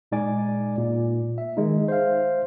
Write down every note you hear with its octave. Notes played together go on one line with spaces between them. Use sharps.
A#2 G#3 D#4 D5 G#5 D6
A#2
E5
D#3 G#3 D#4
C5 E5 F5